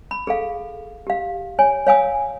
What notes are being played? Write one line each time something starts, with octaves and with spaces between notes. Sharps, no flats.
B5
G#4 A4 F5
G4 F5
C#5 G#5
C#5 F5 G#5 D#6